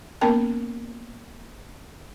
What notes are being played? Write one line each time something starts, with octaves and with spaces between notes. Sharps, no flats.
A#3 B3 C#4 A#4 G5 A5